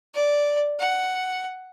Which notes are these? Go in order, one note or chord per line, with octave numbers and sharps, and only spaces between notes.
D5
F#5